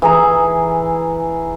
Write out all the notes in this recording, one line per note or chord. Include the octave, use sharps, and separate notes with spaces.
E3 G#4 A#5